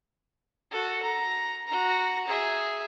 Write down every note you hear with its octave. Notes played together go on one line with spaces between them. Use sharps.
F#4 A4
A#5
F#4 A#5
G#4 E5